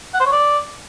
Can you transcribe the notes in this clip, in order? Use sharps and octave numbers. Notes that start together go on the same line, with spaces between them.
F#5
C5
C#5
D5